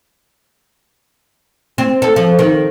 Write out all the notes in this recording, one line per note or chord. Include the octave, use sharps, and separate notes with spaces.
C4
A4
F3
D#3